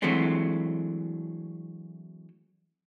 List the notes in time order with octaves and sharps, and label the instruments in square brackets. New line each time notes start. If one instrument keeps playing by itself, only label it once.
[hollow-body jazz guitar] E3 F#3 G#3 A3 C4 D4